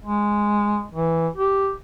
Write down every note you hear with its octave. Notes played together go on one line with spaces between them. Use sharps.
G#3
E3
G4